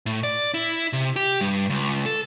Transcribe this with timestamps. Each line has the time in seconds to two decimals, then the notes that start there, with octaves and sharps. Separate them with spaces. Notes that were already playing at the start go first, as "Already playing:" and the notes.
0.06 A2
0.23 D5
0.54 E4
0.93 C3
1.16 G4
1.41 G2
1.70 C#2
2.06 A4